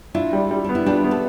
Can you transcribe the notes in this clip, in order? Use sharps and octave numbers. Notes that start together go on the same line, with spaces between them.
D4 E4 F4
G3
G3
B3 D4
E4
G3 D4 F4
B3
A4